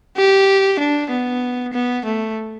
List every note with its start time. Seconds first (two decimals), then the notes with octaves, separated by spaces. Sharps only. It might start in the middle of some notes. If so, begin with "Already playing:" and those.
0.17 G4
0.79 D4
1.10 B3
1.73 B3
2.05 A3